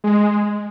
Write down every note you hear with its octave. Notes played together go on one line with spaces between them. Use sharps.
G#3